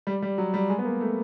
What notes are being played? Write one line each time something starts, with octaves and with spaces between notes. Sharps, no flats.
G3
G3
F#3
G3
G#3
B3
A#3
A3